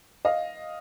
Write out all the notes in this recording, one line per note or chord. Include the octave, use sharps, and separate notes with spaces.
D#5 F5